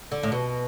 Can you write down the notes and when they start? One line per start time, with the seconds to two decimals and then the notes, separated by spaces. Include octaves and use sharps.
0.12 D3
0.23 A2
0.32 B2